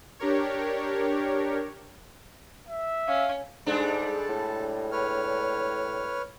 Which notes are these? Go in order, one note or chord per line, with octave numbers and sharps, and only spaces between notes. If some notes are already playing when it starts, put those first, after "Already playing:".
D4 G4 A#4 C#5
E5
C#4 F5
G#2 G3 G#3 D4 A4 A5
A2
B4 C#5 F6